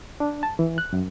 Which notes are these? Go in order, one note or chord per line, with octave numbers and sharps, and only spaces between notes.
D4
A5
E3
F#6
F#2